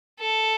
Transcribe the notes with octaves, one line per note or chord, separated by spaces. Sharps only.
A4